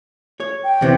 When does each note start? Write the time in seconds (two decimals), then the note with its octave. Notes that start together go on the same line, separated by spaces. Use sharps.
0.40 C#5
0.64 G5
0.81 E2 C3 E3